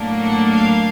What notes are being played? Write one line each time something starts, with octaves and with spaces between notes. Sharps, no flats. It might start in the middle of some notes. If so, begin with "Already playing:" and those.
Already playing: A2 F#3 A#3 D4
F#5
F5